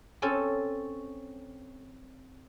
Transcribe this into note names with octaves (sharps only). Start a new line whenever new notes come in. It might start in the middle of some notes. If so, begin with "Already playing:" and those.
C4 C#4 A4